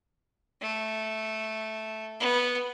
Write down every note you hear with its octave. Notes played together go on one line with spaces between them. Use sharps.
A3
B3